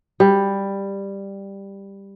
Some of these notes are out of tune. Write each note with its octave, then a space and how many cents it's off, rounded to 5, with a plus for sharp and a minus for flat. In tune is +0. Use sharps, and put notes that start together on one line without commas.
G3 +10